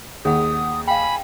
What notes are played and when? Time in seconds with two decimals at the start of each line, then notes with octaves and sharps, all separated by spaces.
0.25 D#2 G#4 F#5 D#6
0.88 F5 G5 G#5 B5